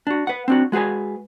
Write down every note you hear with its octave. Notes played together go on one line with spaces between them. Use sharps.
D4 F#4
B4 F#5
C4 D4 F#4
G#3 F#4 G#4 B4 G#5